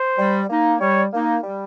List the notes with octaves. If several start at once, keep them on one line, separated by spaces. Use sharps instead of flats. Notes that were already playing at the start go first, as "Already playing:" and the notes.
Already playing: C5
G3
A#3 D#4
G3 C#5
A#3 D#4
G3